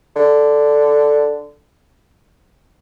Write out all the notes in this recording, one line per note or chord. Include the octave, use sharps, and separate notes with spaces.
D3